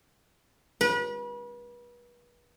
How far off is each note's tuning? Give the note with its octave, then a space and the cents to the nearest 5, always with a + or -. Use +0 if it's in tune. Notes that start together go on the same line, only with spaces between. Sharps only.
B4 -35